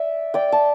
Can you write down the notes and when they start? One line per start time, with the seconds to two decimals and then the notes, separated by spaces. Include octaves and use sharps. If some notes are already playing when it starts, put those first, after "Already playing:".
Already playing: D5 E5
0.34 D5 G5
0.52 A5